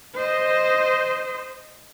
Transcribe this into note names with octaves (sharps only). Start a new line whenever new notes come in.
C5 D#5